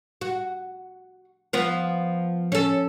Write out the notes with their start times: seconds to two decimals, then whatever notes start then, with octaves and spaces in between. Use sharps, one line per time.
0.21 F#4
1.53 F3 B3
2.52 C#4 A4